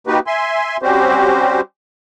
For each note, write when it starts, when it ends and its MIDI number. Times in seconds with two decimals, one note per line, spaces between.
0.07 0.19 58
0.07 0.19 63
0.07 0.19 66
0.07 0.19 67
0.07 0.19 71
0.27 0.77 76
0.27 0.77 80
0.27 0.77 84
0.82 1.61 55
0.82 1.61 60
0.82 1.61 61
0.82 1.61 66
0.82 1.61 67
0.82 1.61 72